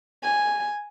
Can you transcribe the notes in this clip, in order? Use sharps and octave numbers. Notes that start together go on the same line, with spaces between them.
G#5